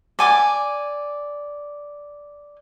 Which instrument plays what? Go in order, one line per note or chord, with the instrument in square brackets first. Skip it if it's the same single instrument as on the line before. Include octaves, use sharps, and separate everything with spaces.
[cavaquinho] D5 G#5 D6